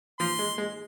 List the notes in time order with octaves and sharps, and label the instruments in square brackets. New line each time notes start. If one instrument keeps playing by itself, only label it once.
[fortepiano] F3 [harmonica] C6
[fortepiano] G#3
G#3